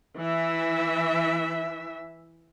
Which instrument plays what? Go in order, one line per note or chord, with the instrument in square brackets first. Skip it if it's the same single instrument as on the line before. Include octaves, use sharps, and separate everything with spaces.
[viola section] E3 E5